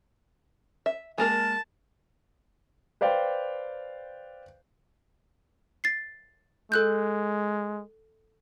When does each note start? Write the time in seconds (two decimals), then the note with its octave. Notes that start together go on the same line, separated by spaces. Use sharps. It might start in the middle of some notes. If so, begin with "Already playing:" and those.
0.86 E5
1.18 G#3 A#3 A#4 A5
3.01 B4 C5 D5 F5 G5
5.84 A6 C7
6.72 G#3 A4 F#6 G6